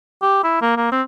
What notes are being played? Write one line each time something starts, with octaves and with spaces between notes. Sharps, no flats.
G4
E4
A#3
A#3
C4